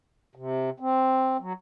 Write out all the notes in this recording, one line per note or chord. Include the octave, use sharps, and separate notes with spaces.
C3
C4
F#3